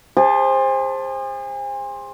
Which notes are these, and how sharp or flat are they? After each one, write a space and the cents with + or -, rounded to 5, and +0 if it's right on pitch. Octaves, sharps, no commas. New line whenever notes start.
G#4 -40 C5 +15 A5 +0